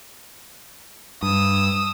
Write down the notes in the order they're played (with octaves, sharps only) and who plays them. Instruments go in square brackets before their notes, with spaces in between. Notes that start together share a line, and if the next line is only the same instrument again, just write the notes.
[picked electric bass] G2 [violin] D#6 E6